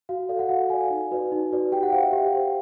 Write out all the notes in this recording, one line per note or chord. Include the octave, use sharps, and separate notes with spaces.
F#4 F5
A4 D5 F5
F#5
F#4 F5
A4 D5 G#5
D#4
F#4 B4 D5
D#4
F#4 B4 D5
G4 G5
F#5
C5 F5
E5
G4
C5